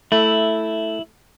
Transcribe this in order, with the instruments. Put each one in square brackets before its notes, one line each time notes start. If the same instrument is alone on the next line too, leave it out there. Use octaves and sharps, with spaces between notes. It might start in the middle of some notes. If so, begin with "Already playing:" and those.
[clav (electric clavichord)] A3 [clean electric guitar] E4